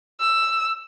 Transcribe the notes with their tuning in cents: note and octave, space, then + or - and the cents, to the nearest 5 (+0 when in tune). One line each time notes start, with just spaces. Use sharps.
E6 +10